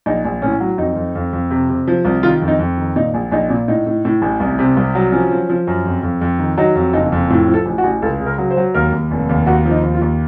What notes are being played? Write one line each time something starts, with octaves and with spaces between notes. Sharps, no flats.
A#1 D#4
A#1
A2 C#4
F#3
F2 D#4
F2
F2
F2
C3
C3
F3
C2
D#3 F4
F2
D#4
F2
D#3
A#2 D#4
A#1
A#1 D#4
A#2
A2 D#4
A2
A2
A1
C2
C3
C2
F#3
F3 C#4
F3
F3
F#2
F2
F2
F2
D#3
F#3 D#4
F2
F#1 D#4
F2
A2 F4
F3
A4
A1
F#4
A1
C#2 A4
C#3
A#4
F#3
C5
F#3
D#2 A#4
D#2
F1
D#2
D#2 F#4
F3
D#4
D#2
F4
D#2